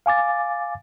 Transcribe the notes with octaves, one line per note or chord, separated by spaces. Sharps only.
F5 G#5 D6 A6